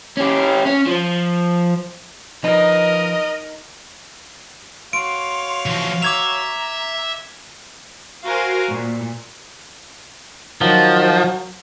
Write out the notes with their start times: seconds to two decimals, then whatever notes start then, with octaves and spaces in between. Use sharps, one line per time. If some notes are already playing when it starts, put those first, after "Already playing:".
0.17 C#4 G4
0.66 C#4
0.86 F3
2.44 F3 D#4 A#4 B4 D#5
4.93 F#4 C#5 F5 C6 D7
5.66 E3 F3
6.02 E5 A#5 D6 G#6 F7
8.25 F#4 A#4 C5 F5 G#5
8.69 A#2
10.61 D#3 F3 F#3